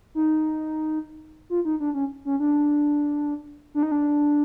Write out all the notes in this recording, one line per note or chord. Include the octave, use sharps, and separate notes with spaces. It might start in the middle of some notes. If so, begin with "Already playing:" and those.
D#4
F4
D#4
D4
C#4
C#4
D4
D4
D#4
D4